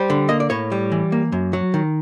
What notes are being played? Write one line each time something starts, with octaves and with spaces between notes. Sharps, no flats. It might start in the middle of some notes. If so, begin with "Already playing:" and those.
Already playing: G3 C5
D3
A#3 D#5
D5
A2 C#5
G3
E3
A#3
F#2
F#3
D#3